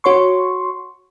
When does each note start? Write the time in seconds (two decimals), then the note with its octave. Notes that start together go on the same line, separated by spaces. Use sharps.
0.04 F#4 C#5 C6 C#6